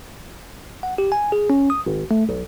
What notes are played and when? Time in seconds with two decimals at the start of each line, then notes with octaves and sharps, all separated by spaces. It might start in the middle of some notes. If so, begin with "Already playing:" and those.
0.83 F#5
0.98 G4
1.12 G#5
1.32 G#4
1.50 C#4
1.70 D#6
1.86 G#1
2.11 A3
2.29 B1